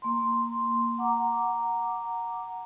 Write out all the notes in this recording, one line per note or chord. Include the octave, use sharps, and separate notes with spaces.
A#3 C6
F#5 A#5 D6